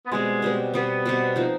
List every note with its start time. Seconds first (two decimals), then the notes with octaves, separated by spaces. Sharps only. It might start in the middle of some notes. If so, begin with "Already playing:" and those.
0.06 B3
0.12 B2 G3 G#3 C4
0.42 B2 G3 C4
0.74 B2 G3 B3 C4
1.06 B2 G3 C4
1.36 F3 C4 D#4